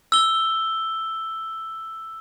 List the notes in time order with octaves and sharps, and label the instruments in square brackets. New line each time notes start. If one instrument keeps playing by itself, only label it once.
[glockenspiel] E6 G7